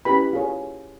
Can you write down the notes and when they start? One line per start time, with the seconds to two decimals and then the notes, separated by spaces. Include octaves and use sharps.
0.05 C#4 E4 G4 B4 B5
0.33 F4 G#4 C#5